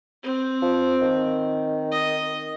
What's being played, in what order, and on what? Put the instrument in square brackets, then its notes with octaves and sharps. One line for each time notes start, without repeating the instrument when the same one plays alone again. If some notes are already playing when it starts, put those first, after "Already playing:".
[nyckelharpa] C4
[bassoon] F3
D#3
[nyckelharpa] D#5